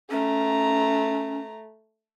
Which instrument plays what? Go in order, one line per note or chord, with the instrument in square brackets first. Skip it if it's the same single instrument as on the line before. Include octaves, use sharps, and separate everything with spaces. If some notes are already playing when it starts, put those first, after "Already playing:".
[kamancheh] A3 A#5 [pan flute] C#4